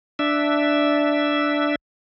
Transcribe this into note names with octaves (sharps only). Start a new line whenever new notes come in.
D4 E5